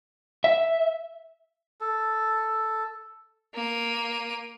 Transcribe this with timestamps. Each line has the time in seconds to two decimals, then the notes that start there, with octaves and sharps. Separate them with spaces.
0.44 E5
1.81 A4
3.55 A#3 D#7